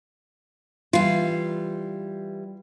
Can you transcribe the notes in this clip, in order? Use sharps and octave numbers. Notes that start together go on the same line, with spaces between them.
E3 G3 F4